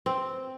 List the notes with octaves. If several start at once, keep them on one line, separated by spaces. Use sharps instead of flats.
C4